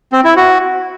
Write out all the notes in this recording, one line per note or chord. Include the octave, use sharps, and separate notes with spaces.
C4
E4
F#4